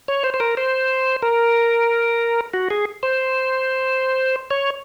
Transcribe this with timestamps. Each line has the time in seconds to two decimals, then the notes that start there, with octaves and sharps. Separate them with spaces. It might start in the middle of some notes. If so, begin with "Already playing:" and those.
0.08 C#5
0.24 C5
0.34 C5
0.40 A#4
0.57 C5
1.22 A#4
2.54 F#4
2.71 G#4
3.03 C5
4.51 C#5